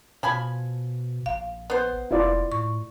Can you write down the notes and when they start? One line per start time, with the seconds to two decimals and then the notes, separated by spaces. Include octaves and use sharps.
0.23 B2 F3 G#5 B5
1.26 A#1 F5
1.70 B3 C5
2.11 F1 E4 F4 D5
2.52 A2 C#6